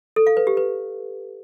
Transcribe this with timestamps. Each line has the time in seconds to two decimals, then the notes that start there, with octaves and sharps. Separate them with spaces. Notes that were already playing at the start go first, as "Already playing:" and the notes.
0.16 A4
0.27 F5
0.37 B4
0.47 G4
0.57 B4